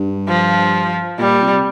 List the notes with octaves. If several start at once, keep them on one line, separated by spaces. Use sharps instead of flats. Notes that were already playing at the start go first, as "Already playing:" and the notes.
Already playing: G2
F3
A#2 G3
C3